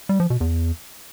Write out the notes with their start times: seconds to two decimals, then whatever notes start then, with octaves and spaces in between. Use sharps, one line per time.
0.09 G3
0.20 F3
0.30 B2
0.41 E2